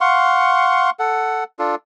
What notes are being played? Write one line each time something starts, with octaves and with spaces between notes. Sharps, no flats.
F5 F#5 C6 C#6
A4 F#5
D4 F4 A4